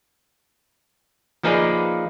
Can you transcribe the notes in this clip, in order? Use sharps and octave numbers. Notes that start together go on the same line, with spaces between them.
F3 A#3 D#4 G#4 B4 D5